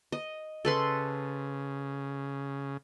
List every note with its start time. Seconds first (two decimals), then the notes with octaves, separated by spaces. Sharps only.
0.12 D#5
0.65 C#3 A4 B4 C6